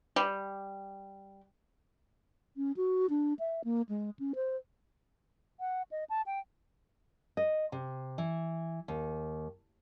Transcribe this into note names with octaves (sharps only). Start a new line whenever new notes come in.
G3
C#4
F#4
D4
E5
A#3
G#3
C#4
C5
F#5
D#5
A5
G5
D#5
C3
E3
D#2